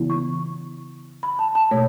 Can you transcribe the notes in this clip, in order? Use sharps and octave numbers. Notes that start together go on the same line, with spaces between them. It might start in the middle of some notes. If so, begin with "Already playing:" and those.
Already playing: C#3 E3 B3 E4
C#6
B5
A5
A5
B2 A3 C#5